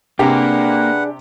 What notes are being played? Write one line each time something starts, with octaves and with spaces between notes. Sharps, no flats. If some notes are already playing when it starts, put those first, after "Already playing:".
C3 A#3 D4 G4 G#4 B4 F#5